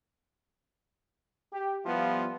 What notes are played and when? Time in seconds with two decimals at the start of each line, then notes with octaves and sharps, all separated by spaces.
1.52 G4
1.84 F3 G3 B3 E4 F4